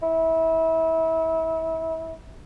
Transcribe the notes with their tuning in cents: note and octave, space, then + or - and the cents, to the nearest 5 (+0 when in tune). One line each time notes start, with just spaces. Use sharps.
E4 -30